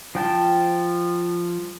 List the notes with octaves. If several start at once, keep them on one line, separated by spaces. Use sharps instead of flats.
F3 G5 A5